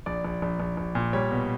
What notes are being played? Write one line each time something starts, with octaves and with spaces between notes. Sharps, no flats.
A#1 D5
A#1
A#1
A#1
A#1
A#2
G3 C#5
B2